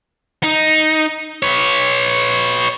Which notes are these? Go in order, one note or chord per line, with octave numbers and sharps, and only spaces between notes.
D#4
B4 C#5